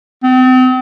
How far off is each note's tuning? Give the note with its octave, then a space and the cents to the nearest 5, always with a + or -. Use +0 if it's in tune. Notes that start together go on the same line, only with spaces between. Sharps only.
C4 -40